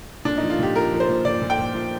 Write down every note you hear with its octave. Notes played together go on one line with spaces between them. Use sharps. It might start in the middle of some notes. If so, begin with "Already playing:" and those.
A#2 D4
D#4
F3
F4
A#2 G4
F3 A#4
F3
C5
A#2
A#2 D5
A#2
G5
A#2
F3